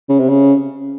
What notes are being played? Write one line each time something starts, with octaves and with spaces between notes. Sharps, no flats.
C#3
C3
C#3